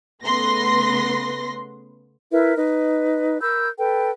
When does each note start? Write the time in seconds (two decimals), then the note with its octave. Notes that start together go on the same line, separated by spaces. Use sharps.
0.24 C#3 A3 B3 B4 C6 A#6
2.32 E4 A#4 B4 E5
2.57 D#4 B4 D#5
3.41 A#4 B5 E6 G6
3.78 A4 B4 G5